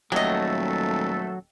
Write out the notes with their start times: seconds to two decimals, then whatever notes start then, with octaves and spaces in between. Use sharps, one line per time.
0.12 D#1 F#3 A3 G4 A4 D#5